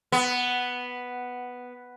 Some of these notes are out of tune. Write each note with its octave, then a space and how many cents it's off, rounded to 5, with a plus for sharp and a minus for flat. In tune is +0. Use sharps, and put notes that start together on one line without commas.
B3 +0